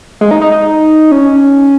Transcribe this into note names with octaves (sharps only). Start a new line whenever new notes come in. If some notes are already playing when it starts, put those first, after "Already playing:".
G#3
D#4
D#4
D#4
C#4